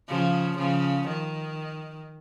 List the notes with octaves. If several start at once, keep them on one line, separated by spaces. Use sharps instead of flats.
C#3 F3
C#3 F3
D#3